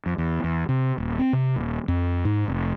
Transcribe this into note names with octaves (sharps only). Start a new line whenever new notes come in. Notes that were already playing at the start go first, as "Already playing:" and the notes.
F2
E2
E2
C3
D#1
C4
C3
D#1
F2
G#2
F1